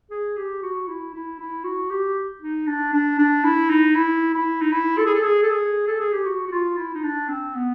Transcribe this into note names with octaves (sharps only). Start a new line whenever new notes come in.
G#4
G4
F#4
E4
E4
E4
F#4
G4
D#4
D4
D4
D4
E4
D#4
E4
E4
D#4
E4
A4
G#4
A4
G#4
A4
G#4
A4
G#4
G4
F#4
F#4
F4
E4
D#4
D4
C4
B3